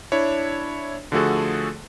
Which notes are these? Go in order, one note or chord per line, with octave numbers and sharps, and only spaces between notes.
D4 E4 C#5
D3 F3 A3 F#4 G#4 A4